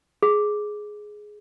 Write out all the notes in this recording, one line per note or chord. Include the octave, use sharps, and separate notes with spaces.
G#4